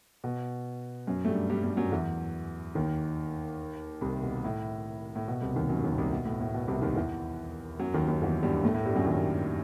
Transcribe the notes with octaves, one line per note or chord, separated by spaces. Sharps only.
B2
F#2 F#3
A3
G2 G3
G2 G3
G2 G3
F#2 F#3
E2 E3
D#2 D#3
C2 C3
B2
A2
A2
B2
C2 C3
D#2 D#3
F#2 F#3
D#2 D#3
C2 C3
B2
A2
A2
B2
C2 C3
D#2 D#3
E2 E3
F#2 F#3
D#2 D#3
D#2 D#3
E2 E3
G2 G3
A2 A3
A2 A3
G2 G3
F#2 F#3
D#2 D#3